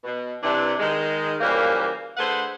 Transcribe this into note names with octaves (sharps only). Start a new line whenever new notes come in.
B2
C3 E3 D4
D#3 G#3
C#3 E3 F3 G3 A#3
D3 A3 G#4 B4 C5 F#5